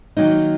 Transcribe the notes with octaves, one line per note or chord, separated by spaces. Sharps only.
D#3 F#3 A#3 D#4